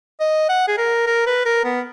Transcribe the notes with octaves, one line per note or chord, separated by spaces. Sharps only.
D#5
F#5
G#4
A#4
A#4
B4
A#4
B3